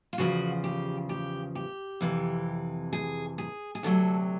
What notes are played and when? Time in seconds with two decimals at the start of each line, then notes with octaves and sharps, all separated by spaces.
0.13 F4
0.18 E2 C#3 F3 F#4
0.64 G4
1.09 G4
1.55 G4
2.01 F2 C3 E3
2.93 G#4
3.38 G#4
3.75 G#4
3.83 D2 C3 D#3 F#3 A4